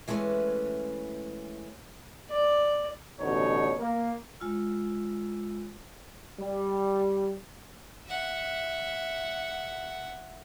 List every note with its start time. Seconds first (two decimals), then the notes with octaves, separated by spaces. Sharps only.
0.08 E3 G#3 A3 C#4 B4
2.30 D5
3.20 A1 D2 B2 D#4 C#5
3.79 A#3
4.40 G#3 F4 E6
6.40 G3
8.06 E5 F#5